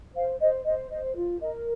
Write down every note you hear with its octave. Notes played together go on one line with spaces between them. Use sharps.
C5 F5
C5 D#5
C5 D#5
C5 D#5
F4
A#4 D#5